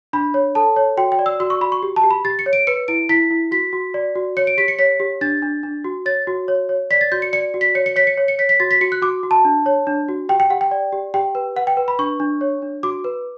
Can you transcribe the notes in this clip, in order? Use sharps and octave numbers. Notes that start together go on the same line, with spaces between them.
D4 B5
C#5
A4 A5
C#5
F#4 G5
G5
D5
E6
F#4 E6
C#6
F#4 B5
C#6
G4
A5
G4
B5
G4 A6
C#7
C#5
D7
B4 C#7
E4 D7
E4 B6
E4
F#4 B6
F#4
D5
F#4
C#5 C#7
D7
G4 B6
C#7
C#5 B6
G4
D4 A6
D4
D4
F#4
C#5 A6
F#4
C#5
C#5
D5 B6
A6
F#4 G6
C#7
D5 C#7
F#4
B6
C#5 C#7
C#7
C#5 B6
C#7
C#5
C#7
C#5 B6
B6
F#4 A6
B6
F#4 C#7
F#6
F#4 D6
F#4
A5
D4
C#5
D4
F#4
G4 G5
G5
G4 F#5
G5
D5
G4
G4 G5
B4
B4 F#5
G5
B4
B5
D4 C#6
D4
C#5
D4
F#4 D6
B4